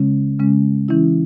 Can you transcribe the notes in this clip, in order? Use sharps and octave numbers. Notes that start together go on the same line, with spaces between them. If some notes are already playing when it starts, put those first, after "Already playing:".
Already playing: C#3 G#3 C#4
C#3 G#3 C#4
E3 C#4 E4